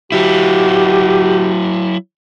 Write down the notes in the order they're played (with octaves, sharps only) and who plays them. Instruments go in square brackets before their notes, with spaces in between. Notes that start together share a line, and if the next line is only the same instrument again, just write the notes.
[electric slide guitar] F#3 E4 [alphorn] F#4 [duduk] G4